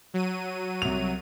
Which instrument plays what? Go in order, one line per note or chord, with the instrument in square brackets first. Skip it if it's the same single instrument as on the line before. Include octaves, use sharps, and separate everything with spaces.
[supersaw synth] F#3 D#7
[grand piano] C2 F7